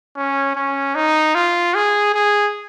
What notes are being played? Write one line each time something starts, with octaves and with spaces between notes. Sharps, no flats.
C#4
C#4
D#4
F4
G#4
G#4